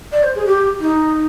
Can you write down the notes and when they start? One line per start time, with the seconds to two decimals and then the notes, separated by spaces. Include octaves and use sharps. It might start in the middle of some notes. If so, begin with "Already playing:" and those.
0.12 D5
0.23 C5
0.35 G#4
0.46 G4
0.80 D#4